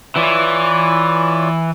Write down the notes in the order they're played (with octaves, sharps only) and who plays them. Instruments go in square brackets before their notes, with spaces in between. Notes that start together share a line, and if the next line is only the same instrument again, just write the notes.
[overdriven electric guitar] E3 [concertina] F4 C#5 D5